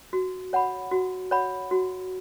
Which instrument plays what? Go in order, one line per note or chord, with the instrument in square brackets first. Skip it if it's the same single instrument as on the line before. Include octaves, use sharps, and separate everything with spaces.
[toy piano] F#4
C#5 F#5 B5
F#4
C#5 F#5 B5
F#4